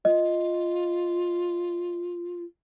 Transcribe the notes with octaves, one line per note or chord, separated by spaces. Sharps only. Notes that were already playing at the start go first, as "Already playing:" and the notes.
F4 D#5